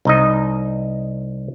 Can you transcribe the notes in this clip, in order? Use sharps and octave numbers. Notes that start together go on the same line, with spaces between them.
C2 D#4 D#5